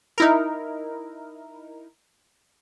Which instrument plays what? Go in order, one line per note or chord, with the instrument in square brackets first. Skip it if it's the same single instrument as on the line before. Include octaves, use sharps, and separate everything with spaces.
[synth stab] D#4 E4 A#4